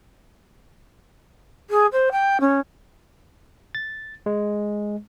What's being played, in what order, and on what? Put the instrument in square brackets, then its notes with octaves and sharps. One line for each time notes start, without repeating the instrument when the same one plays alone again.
[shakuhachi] G#4
C5
G5
C#4
[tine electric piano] A6
G#3